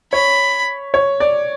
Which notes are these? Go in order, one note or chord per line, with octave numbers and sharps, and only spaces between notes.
C#5 B5
C#5
D5